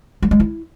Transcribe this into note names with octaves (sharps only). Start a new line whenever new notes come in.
G3
G#3
E4